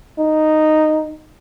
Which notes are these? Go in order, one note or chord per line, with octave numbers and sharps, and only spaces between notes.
D#4